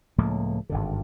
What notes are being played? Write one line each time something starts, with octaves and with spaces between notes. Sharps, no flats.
C#2 A2 F3 A#3
G#1 G2 D3